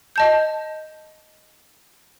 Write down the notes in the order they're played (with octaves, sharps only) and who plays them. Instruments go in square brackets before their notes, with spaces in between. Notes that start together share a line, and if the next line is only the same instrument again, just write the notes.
[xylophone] D#5 A5 G6